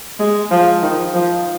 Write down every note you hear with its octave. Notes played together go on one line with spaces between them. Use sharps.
G#3
F3
D#3
F3